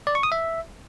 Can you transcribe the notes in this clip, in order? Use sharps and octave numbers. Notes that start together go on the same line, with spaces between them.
D5
C#6
D#6
E5